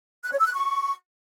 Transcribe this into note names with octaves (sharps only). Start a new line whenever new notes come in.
F#6
C#5
E6
F#6
C#6